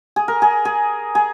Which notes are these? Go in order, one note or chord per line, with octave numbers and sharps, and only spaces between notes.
G#4
A#4
G#4
G#4
G#4